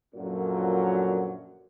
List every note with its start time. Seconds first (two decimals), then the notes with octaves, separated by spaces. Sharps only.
0.14 F#2 A#2 D3 F3 F#3